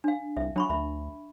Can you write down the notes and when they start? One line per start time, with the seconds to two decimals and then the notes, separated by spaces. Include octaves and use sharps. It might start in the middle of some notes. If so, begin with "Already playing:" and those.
0.04 D4 F5
0.37 C2 E5
0.56 F#3 D4 B5 C#6
0.70 D2 E5 B5